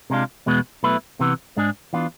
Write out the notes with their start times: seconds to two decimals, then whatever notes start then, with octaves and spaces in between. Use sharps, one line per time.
0.10 C3 G#3 D4 F4
0.46 E2 B2 G#3 B3
0.83 B1 B2 A3 E4 B4
1.20 C3 E3 B3
1.57 G#2 G#3 D4 G#4
1.93 E3 B3 D4 F4